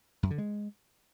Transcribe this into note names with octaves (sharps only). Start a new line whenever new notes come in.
F#2
D3
G#3